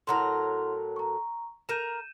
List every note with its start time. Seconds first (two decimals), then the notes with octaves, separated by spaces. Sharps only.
0.07 A2 F#3 E4 A#4 F#5 C6
0.96 A#5 C#6
1.69 A#4 A#5 G6 D#7 E7